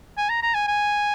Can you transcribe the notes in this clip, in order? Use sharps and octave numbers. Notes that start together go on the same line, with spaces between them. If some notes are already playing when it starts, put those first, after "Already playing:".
G#5
A#5
A#5
G#5
G#5